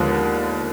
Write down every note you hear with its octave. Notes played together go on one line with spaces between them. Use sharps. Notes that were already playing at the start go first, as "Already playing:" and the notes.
Already playing: D#2 D3 F3 G#3 B3